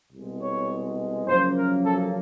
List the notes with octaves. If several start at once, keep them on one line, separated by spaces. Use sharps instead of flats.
C2 B2 G#3
C#5
F#2 C#3 F3 A#3 C5
A#4
A4